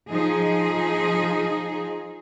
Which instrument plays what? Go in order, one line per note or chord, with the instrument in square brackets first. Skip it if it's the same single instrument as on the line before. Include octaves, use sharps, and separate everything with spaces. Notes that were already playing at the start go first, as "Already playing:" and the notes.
[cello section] F3 D#4 G#4